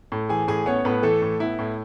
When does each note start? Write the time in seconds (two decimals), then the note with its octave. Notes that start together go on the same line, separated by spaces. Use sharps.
0.12 A2
0.29 E3 G#4 G#5
0.48 A2 G#4 G#5
0.66 B3 C#4 C#5
0.85 A2 B3 B4
1.03 E3 A3 A4
1.22 A2
1.40 B3 E4
1.59 A2